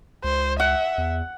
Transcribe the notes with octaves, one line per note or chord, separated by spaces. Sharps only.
C#2 C5
E5 F#5
E2